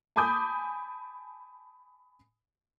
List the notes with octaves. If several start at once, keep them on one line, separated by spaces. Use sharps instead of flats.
G#5 A5 B5 D6 D#6 G6